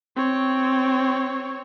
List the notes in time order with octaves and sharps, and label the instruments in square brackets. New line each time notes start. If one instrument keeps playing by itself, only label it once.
[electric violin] C4 C#5